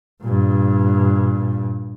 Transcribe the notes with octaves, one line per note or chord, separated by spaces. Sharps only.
G2 A#2